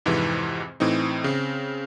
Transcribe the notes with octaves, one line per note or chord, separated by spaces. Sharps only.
F2 G#2 C3 E3
A2 E3 C4 D#4
C#3 C4